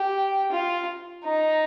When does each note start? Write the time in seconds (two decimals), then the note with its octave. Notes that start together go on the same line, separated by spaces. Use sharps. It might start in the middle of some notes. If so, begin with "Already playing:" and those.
Already playing: G4
0.52 F4
1.24 D#4